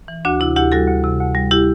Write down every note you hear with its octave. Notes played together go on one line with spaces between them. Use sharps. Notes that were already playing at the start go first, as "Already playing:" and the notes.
E3
D2 D4 F#4
C3 E4
D2 E4 G4
G3 F#4 A4
D2
C3
D2
G3
E4 G4